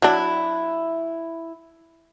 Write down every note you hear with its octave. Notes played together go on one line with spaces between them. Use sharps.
F#3 D4 E4